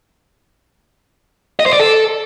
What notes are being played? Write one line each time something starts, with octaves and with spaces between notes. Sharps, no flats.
D#5
C5
D5
A4